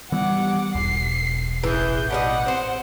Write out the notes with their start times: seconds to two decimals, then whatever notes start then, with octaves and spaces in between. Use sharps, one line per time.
0.12 E3 G3 B3 F#5 D6
0.75 E1 B1 C7
1.63 A1 E3 G#4 G6
2.10 B2 G3 D#5 F#5
2.46 C4 C5